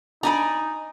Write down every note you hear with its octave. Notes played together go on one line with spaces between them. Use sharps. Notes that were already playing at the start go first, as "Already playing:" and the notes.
D4 D#4 D5 G#5 A#5 B5